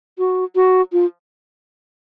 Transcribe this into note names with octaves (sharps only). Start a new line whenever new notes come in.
F#4
F#4
F4